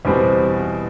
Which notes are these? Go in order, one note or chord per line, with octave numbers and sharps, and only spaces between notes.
E2 B2 G3 C4